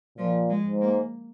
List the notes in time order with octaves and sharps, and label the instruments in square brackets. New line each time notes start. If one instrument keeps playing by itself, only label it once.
[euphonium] A#2 [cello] F3
[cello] G#3
[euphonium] G#2
[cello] A#3